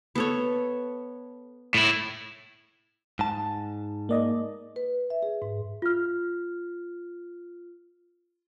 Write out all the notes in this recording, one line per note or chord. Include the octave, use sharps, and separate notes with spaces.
B3 A4 C#5
A2 E4
G#2 A5
A#3 D5 D#5
B4
E5
G#4
G#2
F4 F6